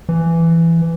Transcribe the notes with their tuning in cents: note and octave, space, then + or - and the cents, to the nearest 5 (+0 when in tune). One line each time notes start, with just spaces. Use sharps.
E3 +15